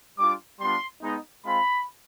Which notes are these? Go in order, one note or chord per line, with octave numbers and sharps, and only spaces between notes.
G3 D4 F4 D6
G3 B3 D4 F4 C6
G#3 B3 D#4
G#3 C4 F4 B5